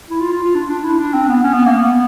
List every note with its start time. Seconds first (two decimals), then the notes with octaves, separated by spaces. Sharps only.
0.10 E4
0.20 F4
0.32 F4
0.43 F4
0.55 D4
0.69 D4
0.84 E4
0.99 D4
1.14 C4
1.28 B3
1.43 C#4
1.54 B3
1.66 A#3
1.77 B3